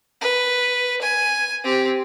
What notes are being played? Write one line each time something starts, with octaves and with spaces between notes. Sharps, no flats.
B4
G#5
C4 G4